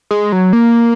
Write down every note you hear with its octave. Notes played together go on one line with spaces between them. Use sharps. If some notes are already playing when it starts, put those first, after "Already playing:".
G#3
F#3
A#3